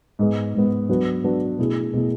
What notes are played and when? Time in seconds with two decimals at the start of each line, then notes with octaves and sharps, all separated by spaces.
0.19 G#2 G#3 B3
0.54 G#2 G#3 B3
0.89 F#3 B3 D4 F#4 B4
1.24 F#3 B3 D4 F#4 B4
1.59 B2 A3 E4 G#4
1.93 B2 A3 E4 G#4